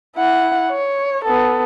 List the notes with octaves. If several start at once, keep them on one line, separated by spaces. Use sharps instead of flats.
E4 F#5
C#5
B3 A4